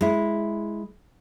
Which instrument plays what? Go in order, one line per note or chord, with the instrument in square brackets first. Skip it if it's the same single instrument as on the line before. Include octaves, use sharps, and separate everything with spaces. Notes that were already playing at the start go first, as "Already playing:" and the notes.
[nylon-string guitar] G#3 E4